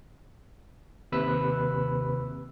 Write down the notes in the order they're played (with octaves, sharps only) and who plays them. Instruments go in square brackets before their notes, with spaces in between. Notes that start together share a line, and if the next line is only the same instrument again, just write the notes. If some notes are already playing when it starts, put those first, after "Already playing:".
[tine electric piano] D#2 C3 B4 B5 E6 F#6